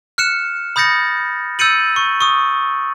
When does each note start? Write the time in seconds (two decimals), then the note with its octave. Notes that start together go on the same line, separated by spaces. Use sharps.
0.18 F6 F#6 C#7 E7
0.76 B5 D#6 G6 A6 A#6 C#7
1.59 E6 G6 A6 C#7 D#7 F#7
1.96 C#6
2.21 C#6 D#6